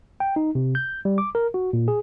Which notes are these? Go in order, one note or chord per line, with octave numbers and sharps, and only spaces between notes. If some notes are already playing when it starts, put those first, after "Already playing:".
G5
D#4
C3
G6
G3
D6
A#4
F#4
A#2
G#4